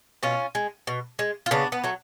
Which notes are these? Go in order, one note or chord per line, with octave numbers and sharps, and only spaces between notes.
B2 C#4 F4
G#3
B2
G#3
F4
C#3 B3 D4
B3
F#3 A3